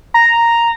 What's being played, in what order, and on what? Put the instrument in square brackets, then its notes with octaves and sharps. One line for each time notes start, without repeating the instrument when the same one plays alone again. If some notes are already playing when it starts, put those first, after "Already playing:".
[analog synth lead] A#5